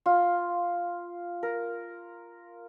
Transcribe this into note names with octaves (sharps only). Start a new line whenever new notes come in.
F4
A#4